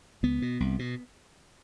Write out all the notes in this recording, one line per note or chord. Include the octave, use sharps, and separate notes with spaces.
C#2 B3
B2
C2
B2